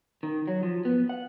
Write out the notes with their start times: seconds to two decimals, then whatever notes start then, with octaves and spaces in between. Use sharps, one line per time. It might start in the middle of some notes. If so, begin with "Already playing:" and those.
0.23 D#3
0.48 F#3
0.63 F3
0.85 B3
1.09 F#5